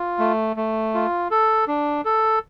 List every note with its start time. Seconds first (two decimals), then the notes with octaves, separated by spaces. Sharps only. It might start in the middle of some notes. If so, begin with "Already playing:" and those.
Already playing: F4
0.19 A3
0.56 A3
0.94 F4
1.31 A4
1.67 D4
2.05 A4